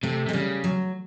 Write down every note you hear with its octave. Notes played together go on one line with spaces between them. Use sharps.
C3 A3
C3 G#3
C#3 G3
F#3